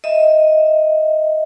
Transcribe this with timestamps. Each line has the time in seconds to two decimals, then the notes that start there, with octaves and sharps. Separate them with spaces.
0.04 D#5 E5